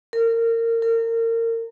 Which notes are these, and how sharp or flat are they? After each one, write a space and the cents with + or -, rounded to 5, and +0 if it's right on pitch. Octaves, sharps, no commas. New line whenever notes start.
A#4 -25
A#4 -30